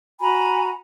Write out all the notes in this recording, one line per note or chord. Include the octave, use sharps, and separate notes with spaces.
F#4 G#5 A#5 B5